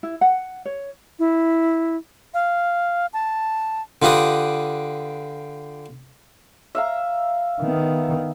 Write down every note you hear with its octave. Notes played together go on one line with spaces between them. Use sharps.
E4
F#5
C#5
E4
F5
A5
D3 F4 G4 B4 D#6
E5 F5 A#5
D#3 B3